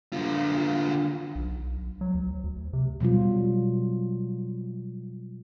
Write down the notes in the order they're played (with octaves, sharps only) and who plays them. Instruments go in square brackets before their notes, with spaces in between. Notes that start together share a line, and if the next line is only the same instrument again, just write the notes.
[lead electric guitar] D3 F4
[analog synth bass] B1
F#3
D2
D2
C3
[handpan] B2 F#3 G3 F4